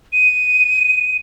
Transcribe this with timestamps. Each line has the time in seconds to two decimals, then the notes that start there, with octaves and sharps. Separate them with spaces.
0.13 D#7